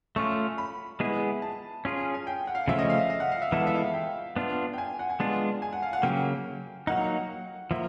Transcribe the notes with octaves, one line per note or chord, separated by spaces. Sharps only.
A3 C#4 F4 C#6
B5
G#3 B3 E4 G#4
A5
C#4 F4 G#4
G#5
G5
F#5
F5
C#3 F3 A3 C#4 E5
D#5
F5
E5
D#5
F#5
F5
E5
E3 G#3 B3 E4 A4 F#5
F5
E5
F5
G5
B3 D4 F4
G5
G#5
F#5
G#5
G#3 B3 D4 F4 A5
G#5
F#5
F5
F#5
C#3 F#3 A#3 G5
F#3 A#3 D#4 F#5
F3 A#3 E5